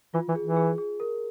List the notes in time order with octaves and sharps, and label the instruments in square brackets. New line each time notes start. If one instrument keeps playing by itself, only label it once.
[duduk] E3 [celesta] F4
[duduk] E3
[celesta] G#4
[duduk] E3
[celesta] G#4
G#4
A#4